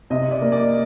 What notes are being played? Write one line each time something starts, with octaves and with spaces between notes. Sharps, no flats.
C3 D#5
D5
A#3
D5